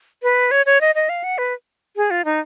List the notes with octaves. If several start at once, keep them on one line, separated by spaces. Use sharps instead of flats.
B4
C#5
C#5
D#5
D#5
F5
F#5
B4
G#4
F4
D#4